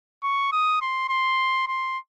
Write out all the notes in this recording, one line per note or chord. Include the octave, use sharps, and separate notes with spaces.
C#6
D#6
C6
C6
C6